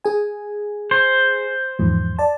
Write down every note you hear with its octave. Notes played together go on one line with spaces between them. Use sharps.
G#4 G#5
C5
E2 G#2 F3
D5 A5